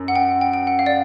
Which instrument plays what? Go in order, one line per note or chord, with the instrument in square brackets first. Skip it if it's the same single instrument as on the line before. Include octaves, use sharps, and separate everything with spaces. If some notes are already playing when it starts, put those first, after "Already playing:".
Already playing: [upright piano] F#2
[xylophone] F#5
G5
G5
G5
F#5
F5
D5